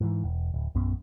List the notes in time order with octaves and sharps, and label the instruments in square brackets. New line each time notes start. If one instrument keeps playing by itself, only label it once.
[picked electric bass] G#2 E3
E1
D1
A#1 F#2 B3 C#4